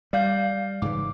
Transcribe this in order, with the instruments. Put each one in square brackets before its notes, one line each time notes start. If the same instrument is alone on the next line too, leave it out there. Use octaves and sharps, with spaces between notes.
[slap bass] G3 [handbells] D5 F5 G6
[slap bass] G#2 C#3 E3 [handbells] D6